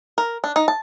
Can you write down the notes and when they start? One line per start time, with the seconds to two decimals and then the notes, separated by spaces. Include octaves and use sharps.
0.18 A#4
0.44 D4
0.56 D#4
0.68 A5